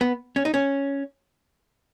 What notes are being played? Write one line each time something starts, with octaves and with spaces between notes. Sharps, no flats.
B3
C#4
D#4
C#4